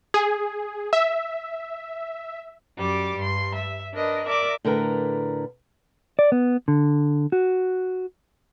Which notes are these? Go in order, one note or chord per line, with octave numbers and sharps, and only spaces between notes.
G#4
E5
F#2 G3 D6
G2 C6
E5
D4 A#4 B4 D#5
A#4 D5 E5 D6
A2 D3 A#4 B4 A#5
D5
B3
D3
F#4